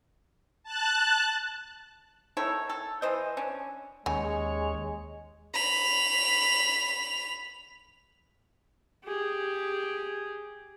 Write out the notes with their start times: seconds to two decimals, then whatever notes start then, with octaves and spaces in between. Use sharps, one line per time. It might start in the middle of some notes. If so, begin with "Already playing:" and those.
0.63 A5 F#6
2.37 D#3 E4 A4 C#5
2.69 A4
3.02 E3 C5 D#5
3.37 C#4 D4
4.06 D#2 C#3 G#3 C#5 G#5
5.53 B5 F7
9.04 G4 G#4